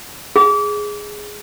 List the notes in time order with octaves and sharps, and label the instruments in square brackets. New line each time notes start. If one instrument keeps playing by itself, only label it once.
[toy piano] G#4